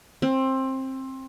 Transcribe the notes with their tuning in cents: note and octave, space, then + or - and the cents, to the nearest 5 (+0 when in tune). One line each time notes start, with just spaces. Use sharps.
C4 +20